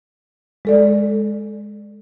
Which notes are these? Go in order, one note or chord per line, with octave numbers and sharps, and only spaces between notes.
G#3 A4 D5